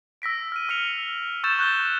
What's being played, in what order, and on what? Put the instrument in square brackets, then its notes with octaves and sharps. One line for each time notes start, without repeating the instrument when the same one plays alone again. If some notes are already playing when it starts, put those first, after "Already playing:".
[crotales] E6 A#6 B6 D7
F6 D#7
E6 F6 C#7 F7
C#6 E6 G6 A6 E7
C#6 F#6 G6 G7